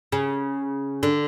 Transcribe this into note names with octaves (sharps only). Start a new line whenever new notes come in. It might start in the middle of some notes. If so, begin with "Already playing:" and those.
C#3
D3